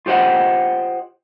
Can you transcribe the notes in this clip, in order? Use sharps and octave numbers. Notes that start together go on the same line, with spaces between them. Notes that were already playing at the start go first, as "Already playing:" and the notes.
F4 G4 C5 D#5 F#5